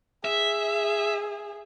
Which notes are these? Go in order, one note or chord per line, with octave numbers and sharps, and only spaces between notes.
G#4 E5